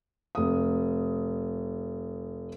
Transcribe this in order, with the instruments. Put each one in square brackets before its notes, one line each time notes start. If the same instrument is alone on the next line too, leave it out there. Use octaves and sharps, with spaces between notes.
[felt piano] F1 D#6